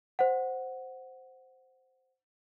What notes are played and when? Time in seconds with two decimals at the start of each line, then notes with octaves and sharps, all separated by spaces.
0.19 C5 F#5